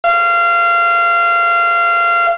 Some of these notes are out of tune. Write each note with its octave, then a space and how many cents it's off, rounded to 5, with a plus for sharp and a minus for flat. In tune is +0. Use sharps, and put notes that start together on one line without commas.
F5 -25